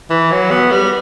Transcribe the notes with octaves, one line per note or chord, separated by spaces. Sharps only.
E3
F#3
B3
G3